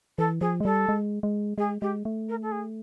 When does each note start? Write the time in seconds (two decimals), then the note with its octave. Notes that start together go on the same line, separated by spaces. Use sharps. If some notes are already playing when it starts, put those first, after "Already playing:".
0.18 E3 A4
0.41 F3 G#4
0.60 G#3
0.64 G3 A4
0.89 G#3
1.23 G#3
1.58 G#3 G#4
1.81 G#3 G4
2.05 A3
2.29 A#4
2.42 A4
2.52 G#4